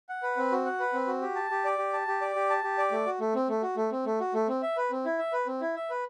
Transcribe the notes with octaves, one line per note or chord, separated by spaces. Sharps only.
F#5
B4
C4
F#4
F#5
B4
C4
F#4
G4
A5
G4
D5
G4
A5
G4
D5
G4
A5
G4
D5
A3
F#4
A3
C4
A3
F#4
A3
C4
A3
F#4
A3
C4
E5
B4
C4
E4
E5
B4
C4
E4
E5
B4